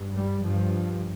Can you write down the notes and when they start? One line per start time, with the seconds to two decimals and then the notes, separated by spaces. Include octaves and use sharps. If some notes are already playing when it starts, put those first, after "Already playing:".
Already playing: G2
0.14 G3
0.43 G2 F3